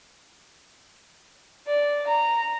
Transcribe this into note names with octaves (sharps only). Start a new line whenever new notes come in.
D5
A#5